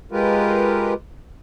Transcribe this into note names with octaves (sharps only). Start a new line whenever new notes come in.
G#3 F4 G4 A#4 B4